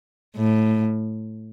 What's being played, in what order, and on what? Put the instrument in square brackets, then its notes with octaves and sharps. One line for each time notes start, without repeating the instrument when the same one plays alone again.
[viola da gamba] A2